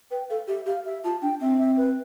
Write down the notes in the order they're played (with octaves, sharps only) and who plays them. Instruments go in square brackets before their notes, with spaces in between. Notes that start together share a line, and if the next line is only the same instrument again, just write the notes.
[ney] B4 [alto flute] G5
[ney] A4 [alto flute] F5
[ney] G4 [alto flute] E5
[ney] G4 [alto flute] F5
[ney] G4 [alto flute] E5
[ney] F4 [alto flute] A5
[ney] D4 [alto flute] G5
[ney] C4 [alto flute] E5
[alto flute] E5
B4